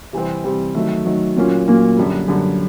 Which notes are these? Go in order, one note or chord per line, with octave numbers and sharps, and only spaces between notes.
C3 E3 G3 C4
C3 E3 G3 C4
D#3 F#3 A3
D#3 F#3 A3
A#2 F#3 A#3 C#4 F4
A#2 F#3 A#3 C#4 F4
F#2 D3 G3
F#2 D3 G3